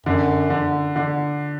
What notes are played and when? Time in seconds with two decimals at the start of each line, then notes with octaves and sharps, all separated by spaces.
0.06 F#2 D3
0.50 D3
0.96 D3